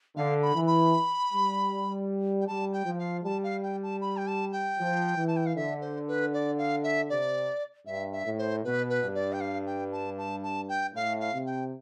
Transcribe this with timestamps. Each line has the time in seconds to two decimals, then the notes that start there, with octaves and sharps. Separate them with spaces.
0.16 D3 F5
0.42 B5
0.55 E3
0.67 B5
1.32 G3
2.41 G5
2.47 G3 A5
2.73 G5
2.86 F3
2.99 F5
3.24 G3 A5
3.44 F5
3.63 G5
3.83 A5
4.01 B5
4.17 G5
4.27 A5
4.52 G5
4.79 F3
5.18 E3
5.28 A5
5.36 G5
5.46 F5
5.55 D3 E5
5.81 C5
6.08 B4
6.33 D5
6.58 F5
6.83 E5
7.09 C3 D5
7.86 G2 E5
8.12 E5
8.26 A2
8.38 C5
8.64 B2 B4
8.90 B4
9.02 G2
9.15 D5
9.33 G5
9.40 F5
9.66 G5
9.92 A5
10.18 A5
10.43 A5
10.69 G5
10.94 A2 F5
11.20 F5
11.33 C3
11.46 G5